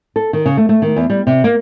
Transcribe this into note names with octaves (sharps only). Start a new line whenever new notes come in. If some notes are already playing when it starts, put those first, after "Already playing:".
A4
D#3
C#3
A3
A3
D#3
E2
G3
C3
A#3